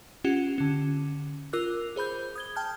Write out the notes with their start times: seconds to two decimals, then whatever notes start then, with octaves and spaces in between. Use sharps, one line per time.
0.24 C#4 F4 G4 F#5 E7
0.58 D3 C#4
1.53 F4 A#4 D6 E6 F#6
1.96 G#4 C5 B5 G6
2.36 D#6 G#6 G7
2.56 G5 A5 F6 G6